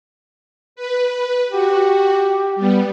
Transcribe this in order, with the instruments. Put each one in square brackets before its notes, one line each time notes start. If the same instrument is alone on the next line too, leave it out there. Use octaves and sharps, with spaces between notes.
[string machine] B4
[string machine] F#4 [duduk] G4
[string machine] G3 B3